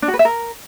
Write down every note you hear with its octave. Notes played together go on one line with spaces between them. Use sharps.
D4
F#4
B4
E5
A#4